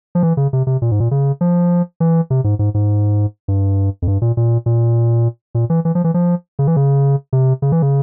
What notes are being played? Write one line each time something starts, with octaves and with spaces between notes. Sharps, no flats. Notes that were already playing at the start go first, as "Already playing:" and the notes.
F3
E3
C#3
C3
C3
A#2
G#2
A#2
C#3
F3
E3
C3
G#2
G#2
G#2
G2
F2
G2
A#2
A#2
A#2
A#2
E3
E3
F3
E3
F3
C#3
E3
C#3
C3
C#3
E3
C#3